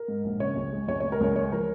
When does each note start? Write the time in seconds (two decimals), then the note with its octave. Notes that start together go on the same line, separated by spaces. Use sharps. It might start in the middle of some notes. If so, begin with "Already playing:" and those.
Already playing: A#4
0.08 G#2
0.24 A#1
0.40 C#3 C#5
0.56 C#2
0.72 G#3
0.88 C#2 C#5
1.00 G#3 C#5
1.12 A#4
1.21 C#2 C#5
1.36 G#3 C#5
1.52 F3 A#4